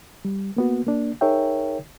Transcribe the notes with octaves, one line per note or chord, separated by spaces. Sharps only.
G3
A#3 B3 F#4
A#3 D4
D#4 G#4 A#4 C#5 E5 G5